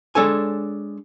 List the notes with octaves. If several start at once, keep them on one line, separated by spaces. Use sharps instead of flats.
G#3 D4 A4 C#5 G#5